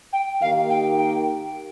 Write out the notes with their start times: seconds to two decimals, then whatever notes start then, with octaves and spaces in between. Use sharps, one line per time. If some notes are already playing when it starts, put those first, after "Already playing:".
0.13 G5
0.42 D#3 A#3 D#4 G4 F5
0.70 G5
0.98 G5